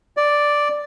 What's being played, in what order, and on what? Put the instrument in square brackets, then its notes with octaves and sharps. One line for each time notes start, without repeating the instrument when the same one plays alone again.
[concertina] D5